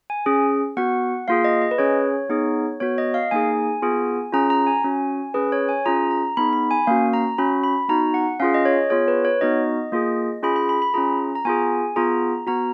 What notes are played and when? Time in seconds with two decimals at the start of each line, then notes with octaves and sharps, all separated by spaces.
0.10 G#5
0.26 C#4 G#4
0.77 B3 F#4 F#5
1.28 A#3 F4 G#4 F5
1.44 D#5
1.62 D#5
1.71 B4
1.78 C#4 G#4 C#5
2.30 B3 D#4 G#4
2.80 B3 F#4 C#5
2.98 D#5
3.14 F5
3.31 A#3 D#4 G#4 G#5
3.82 B3 F4 G#4
4.33 C#4 F4 G#4 A#5
4.50 A#5
4.67 G#5
4.84 C#4 F#4
5.34 C#4 G#4 B4
5.52 C#5
5.69 G#5
5.86 C#4 F4 G#4 A#5
6.11 A#5
6.37 B3 D#4 G#4 B5
6.53 B5
6.71 G#5
6.87 A#3 C#4 F#4 F5
7.13 A#5
7.38 C#4 F#4 B5
7.64 B5
7.89 B3 D#4 F#4 A#5
8.14 F#5
8.40 C#4 F4 G#4 F5
8.54 D#5
8.65 C#5
8.90 B3 F4 G#4 C#5
9.08 B4
9.25 C#5
9.41 B3 D#4 F#4 D#5
9.92 A#3 F4 G#4
10.43 C#4 F4 G#4 B5
10.56 B5
10.69 B5
10.82 B5
10.94 C#4 F4 G#4 A#5
11.35 A#5
11.45 B3 F4 G#4 G#5
11.96 B3 F4 G#4 A#5
12.47 B3 F#4 A#5